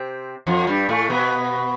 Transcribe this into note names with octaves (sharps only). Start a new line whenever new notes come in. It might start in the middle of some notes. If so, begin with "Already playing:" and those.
Already playing: C3 C4
F2 F3
G2 G3
A2 A3
B2 B3